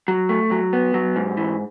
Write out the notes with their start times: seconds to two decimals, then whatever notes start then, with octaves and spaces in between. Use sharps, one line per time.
0.08 F#3
0.29 A3
0.51 F#3
0.73 B3
0.94 F#3
1.16 G#2
1.37 E3